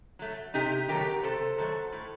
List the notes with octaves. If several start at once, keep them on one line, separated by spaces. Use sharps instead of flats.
F#3 A3
C3 D#4 G4
D#3 F#3 A3 G4 A#4
C3 A4 C5
D#3 F#3 A3
A2